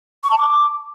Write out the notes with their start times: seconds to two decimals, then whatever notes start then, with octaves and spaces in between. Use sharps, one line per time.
0.24 C#6
0.31 A5
0.38 D6